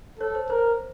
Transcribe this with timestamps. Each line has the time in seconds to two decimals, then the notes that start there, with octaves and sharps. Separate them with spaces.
0.19 A4 C#5
0.35 C5
0.50 A#4 C5